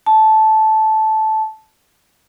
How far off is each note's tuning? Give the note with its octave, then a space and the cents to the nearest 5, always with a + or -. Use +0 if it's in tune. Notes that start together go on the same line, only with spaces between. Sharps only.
A5 -10